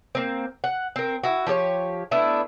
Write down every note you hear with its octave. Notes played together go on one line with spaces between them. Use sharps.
A#3 C4
F#5
C4 A#4
E4 F#4
F3 G4 G#4 C#5
A3 B3 D4 E4